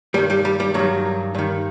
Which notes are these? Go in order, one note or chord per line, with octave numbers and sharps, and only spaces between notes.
G2 D#3 G3
G3
G3
G3
G2 D#3 F#3
G2 D#3